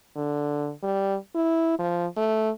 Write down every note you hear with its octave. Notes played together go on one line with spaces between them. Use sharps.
D3
G3
E4
F3
A3